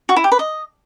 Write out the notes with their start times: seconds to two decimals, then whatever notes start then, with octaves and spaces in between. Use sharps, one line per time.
0.09 F#4
0.16 E4
0.24 G4
0.32 B4
0.39 D#5